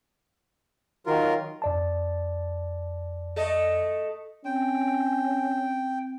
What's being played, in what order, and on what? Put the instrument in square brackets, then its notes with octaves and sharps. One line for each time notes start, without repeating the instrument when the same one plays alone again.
[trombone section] D#3 F#3 [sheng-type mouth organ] F4 A#4
[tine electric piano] F2 D5 A5
[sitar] A3 A4 D#5
[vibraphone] C4 [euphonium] C#4 [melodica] G5